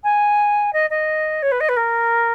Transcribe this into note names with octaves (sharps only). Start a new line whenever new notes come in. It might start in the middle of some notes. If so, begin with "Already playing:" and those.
G#5
D#5
D#5
C#5
B4
D#5
B4
A#4